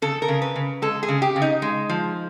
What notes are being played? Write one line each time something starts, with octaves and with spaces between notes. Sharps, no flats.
C#3 A4
A#4
C#3
B4
C#3
G#3 A4
G#4
C#3
G4
C#3
D#4
G#3
F3